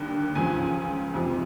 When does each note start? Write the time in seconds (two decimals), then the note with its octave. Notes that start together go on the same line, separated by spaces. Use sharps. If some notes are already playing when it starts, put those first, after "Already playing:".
Already playing: D#2 D3 G3
0.35 C#2 C#3 F3 G#5
1.14 F2 C3 F3